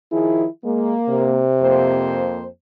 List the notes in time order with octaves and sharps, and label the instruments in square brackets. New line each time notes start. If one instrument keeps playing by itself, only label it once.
[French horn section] D#3 F3 G#4 [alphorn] E4
[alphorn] G#3 [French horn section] A#3
[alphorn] C3
[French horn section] F2 A#3 C5